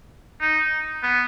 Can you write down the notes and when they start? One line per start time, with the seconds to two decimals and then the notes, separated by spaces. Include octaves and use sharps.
0.41 D#4
1.03 B3